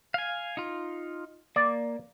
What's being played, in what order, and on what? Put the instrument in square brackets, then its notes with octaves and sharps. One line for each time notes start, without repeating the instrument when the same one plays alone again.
[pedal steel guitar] F5 G#5
D#4 F4
[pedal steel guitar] A#3 [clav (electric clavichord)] D5